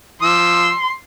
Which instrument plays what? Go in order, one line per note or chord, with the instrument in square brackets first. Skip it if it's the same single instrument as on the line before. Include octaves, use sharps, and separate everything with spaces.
[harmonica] F3 E6 [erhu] C6